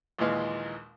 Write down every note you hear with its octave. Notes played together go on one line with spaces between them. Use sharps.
A#1 D#2 A#2 E3 G#3 F5